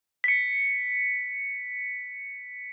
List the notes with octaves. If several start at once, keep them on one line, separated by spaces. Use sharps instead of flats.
B6 C#7